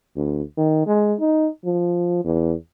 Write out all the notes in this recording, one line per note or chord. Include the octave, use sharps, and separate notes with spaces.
D2
D#3
G#3
D#4
F3
E2